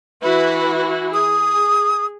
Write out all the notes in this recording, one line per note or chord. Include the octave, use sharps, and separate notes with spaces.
E3 E4 F#4 B4
G#4 D#6